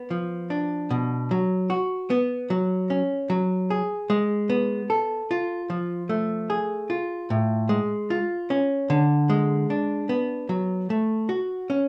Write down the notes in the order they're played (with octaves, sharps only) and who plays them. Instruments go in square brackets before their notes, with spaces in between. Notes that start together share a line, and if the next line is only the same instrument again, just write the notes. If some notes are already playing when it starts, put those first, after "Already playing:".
Already playing: [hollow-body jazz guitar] B3
F3
D4
B2
F#3
F#4
B3
F#3
C#4
F#3
G#4
G#3
B3
A4
F4
F3
A3
G#4
F4
A2
G#3
F4
C#4
D3
G#3
D4
B3
F#3
A3
F#4
C#4